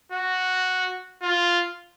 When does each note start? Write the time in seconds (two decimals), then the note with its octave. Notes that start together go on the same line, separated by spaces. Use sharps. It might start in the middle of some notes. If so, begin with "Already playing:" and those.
0.12 F#4
1.22 F4